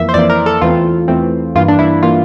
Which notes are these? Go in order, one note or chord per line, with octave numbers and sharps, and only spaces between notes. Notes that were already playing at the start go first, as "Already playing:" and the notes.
Already playing: F2 E3 A#3 E5
C5
F2 E3 A#3 D5
A#4
A4
E2 E3 A3 C4 F4
E2 E3 A3 C4
G2 E3 A#3 F4
D4
E4
E3 A#3 F4